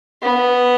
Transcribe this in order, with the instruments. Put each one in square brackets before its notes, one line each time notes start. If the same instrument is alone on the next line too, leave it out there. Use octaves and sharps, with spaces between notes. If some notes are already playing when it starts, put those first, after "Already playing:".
[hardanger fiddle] B3